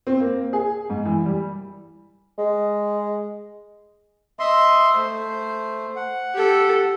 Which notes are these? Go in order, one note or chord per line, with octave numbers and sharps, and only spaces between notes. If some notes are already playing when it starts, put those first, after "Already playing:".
C4
A#3
G#4
G#2
E3
G3
G#3
D#5 E5 C6
A3 C5
F#5
G4 A4